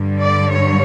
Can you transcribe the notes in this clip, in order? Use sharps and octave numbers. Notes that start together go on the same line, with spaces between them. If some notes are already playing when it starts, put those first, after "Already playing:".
Already playing: G2 D3 G3
D5
C#5